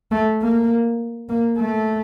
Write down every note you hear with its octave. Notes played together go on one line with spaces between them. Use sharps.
A3
A#3
A#3
A3